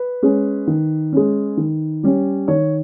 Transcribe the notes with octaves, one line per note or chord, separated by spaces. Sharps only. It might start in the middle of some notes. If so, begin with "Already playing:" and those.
Already playing: B4
G#3 C#4
D#3
G#3 C#4
D#3
G3 C#4
D#3 C#5